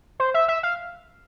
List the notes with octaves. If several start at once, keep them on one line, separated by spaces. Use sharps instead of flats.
C5
E5
E5
F5